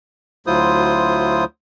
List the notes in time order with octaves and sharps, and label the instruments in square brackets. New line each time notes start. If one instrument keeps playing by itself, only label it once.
[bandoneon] D2 F#3 E4 F4 C5 D#6